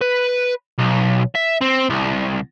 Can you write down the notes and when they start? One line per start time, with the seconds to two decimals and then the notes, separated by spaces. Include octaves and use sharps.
0.02 B4
0.79 B1
1.35 E5
1.62 C4
1.90 C2